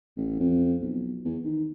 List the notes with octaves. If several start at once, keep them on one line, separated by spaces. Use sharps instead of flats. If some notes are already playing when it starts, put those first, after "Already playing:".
A1
F2
B1
E2
D#3